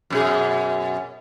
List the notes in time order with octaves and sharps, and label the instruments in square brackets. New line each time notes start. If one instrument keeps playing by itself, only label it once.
[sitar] F#2 B2 G#4